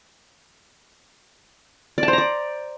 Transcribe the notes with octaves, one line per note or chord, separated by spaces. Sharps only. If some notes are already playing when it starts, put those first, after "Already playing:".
D5
A5
C5
A#5
D5